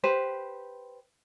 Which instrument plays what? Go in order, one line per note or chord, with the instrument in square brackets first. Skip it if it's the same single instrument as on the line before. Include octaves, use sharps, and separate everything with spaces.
[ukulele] G4 B4 C5